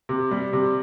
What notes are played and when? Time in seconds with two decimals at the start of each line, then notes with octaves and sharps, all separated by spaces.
0.09 C3
0.31 G3
0.53 C3